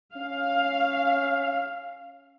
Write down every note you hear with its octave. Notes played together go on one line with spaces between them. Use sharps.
C#4 F5